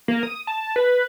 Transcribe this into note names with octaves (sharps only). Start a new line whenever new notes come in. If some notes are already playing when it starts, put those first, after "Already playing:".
A#3
D#6
A5
B4